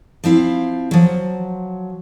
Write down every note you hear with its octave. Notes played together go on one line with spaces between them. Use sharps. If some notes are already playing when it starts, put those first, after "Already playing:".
F3 C4 E4 F5
F3 F#3